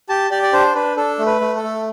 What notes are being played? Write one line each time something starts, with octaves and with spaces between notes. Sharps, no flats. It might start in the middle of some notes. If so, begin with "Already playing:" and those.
G4 A5
G4 D5
D5
D4 C5
D4 B4
D4 A4
A3
B4
A3
A4
A3